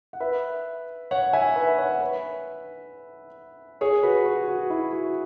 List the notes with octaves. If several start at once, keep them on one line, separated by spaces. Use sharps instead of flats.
F#5
B4 E5
C#5 F#5
E5 G#5
B4 E5
C#5 F#5
B4 E5
G#4 C#5
F#4 B4
F#4
F#4
E4
F#4